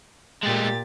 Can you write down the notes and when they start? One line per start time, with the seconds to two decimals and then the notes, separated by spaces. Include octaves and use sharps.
0.43 A#2 G#3 A3 G4 A6